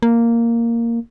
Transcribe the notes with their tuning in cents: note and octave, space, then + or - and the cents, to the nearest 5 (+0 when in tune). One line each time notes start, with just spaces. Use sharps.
A#3 -5